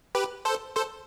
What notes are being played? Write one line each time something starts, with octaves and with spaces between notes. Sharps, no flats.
G4 B4
A4 C5
A4 C5